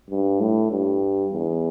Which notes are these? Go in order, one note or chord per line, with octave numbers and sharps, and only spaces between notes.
G2
A2
G2
E2